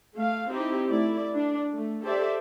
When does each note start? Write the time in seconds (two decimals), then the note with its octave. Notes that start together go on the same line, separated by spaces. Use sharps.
0.16 A3 F5
0.49 C4 D#4 E4 G4
0.89 A3 E4 D5
1.36 D4
1.73 A3
2.03 G4 A4 C5 D5 E5